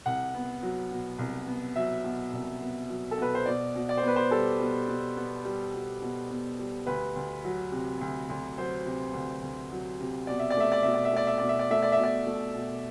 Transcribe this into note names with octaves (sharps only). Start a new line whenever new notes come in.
C2 F#5
B3
F#3
B2
C2
B3
F#3 E5
B2
C2
B3
F#3
A4
B2 B4
C5
B2 D5
B2
D5
C5
B3 B4
C5
G3 A4
B2
B2
B3
G3
B2
B2
B3
G3
D2 B4
D2
F#3
C3
D2
D2
F#3 C5
C3
D2
D2
F#3
C3
B2 D5
E5
D5
A3 E5
D5
B2 E5
D5
E5
A3 D5
E5
B2 D5
E5
D5
A3 E5
D5
E5
B2
D5
A3
B2